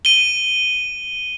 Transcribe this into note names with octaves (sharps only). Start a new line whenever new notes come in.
D#7 G7